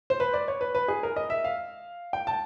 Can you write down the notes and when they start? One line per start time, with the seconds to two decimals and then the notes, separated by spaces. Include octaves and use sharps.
0.10 C5
0.20 B4
0.34 D5
0.48 C#5
0.61 B4
0.75 B4
0.88 G#4
1.03 A#4
1.16 D#5
1.30 E5
1.44 F5
2.13 G5
2.27 A5